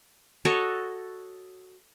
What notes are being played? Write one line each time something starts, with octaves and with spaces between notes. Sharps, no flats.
F#4 A4 C#5 D#5